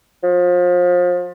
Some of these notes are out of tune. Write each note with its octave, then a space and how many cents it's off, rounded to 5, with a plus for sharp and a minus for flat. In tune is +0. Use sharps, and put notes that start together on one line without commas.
F3 +30